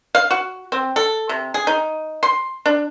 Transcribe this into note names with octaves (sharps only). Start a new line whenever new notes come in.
F5
F#4
C4
A4
C3
G#4
D#4
C6
D4